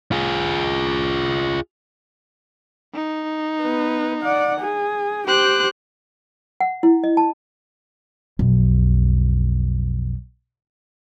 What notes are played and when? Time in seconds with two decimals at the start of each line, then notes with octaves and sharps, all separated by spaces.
0.12 F4 G#4
2.94 D#4
3.62 B3 B4
4.22 D5 F#5
4.59 G#4
5.27 G4 C5 G5 F#6
6.61 F#5
6.83 E4
7.04 D#5
7.17 A5
8.39 B1 F2